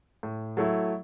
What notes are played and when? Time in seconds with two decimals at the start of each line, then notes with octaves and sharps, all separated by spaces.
0.23 A2
0.57 F#3 A3 E4